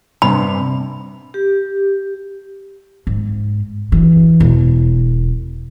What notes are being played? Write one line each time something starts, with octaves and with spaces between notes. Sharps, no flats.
G2 C3 B5
G4
G#2
E3
E1